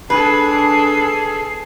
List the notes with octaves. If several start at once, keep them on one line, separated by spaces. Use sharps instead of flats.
D4 G#4 A4 B4 C7